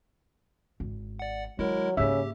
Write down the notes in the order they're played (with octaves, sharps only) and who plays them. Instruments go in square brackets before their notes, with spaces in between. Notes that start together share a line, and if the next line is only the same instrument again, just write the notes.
[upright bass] G#1
[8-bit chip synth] D5 F#5
[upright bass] D#3 [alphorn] F#3 [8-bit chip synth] G#3 E4 A#4
[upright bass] G#2 A#3 [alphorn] C#3 [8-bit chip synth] G4 [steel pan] E5